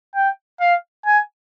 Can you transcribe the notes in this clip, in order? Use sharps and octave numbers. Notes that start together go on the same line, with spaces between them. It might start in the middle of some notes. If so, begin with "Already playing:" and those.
G5
F5
G#5